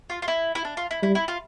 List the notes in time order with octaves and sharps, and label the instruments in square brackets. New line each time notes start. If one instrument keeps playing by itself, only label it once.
[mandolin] F4
F4
E4
E4
D4
F4
E4
[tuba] G3 [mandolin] E4
[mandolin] E4
F4